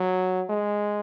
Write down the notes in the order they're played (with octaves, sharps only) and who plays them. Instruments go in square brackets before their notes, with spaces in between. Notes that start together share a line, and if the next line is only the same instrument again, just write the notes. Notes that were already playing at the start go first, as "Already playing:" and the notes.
Already playing: [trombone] F#3
G#3